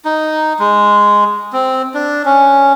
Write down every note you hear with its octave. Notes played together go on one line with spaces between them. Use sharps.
D#4
G#3
C4
D4
C#4